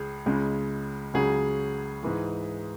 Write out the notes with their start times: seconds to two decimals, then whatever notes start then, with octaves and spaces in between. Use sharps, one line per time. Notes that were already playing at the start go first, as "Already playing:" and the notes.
Already playing: C#2 G#3 G#4
0.26 C#2 C#3 G#3
1.14 C#2 C#3 F#3 G#4
2.03 G#2 E3 G#3